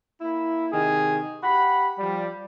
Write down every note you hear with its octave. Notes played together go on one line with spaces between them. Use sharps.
A#3 E4
C3 D#3 G#4
G4 F#5 B5
F3 G3